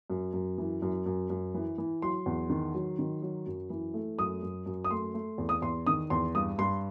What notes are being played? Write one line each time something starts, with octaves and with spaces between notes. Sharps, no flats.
F#2
F#2
E3
F#2
F#2
F#2
E3
E3
F#3 C6
E2
D#3
F#3
D#3
F#3
F#2
E3
A3
F#2 D#6
F#2
F#2
D#6
A3 C6
A3
E2
D#6
E2 C6
D#3 D#6
E2 C6
G2 D#6
G2 C6